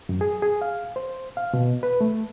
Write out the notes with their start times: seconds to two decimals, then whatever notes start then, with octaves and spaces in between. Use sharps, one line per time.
0.09 F#2
0.21 G#4
0.42 G#4
0.61 F5
0.96 C5
1.37 F5
1.53 B2
1.83 B4
2.01 A3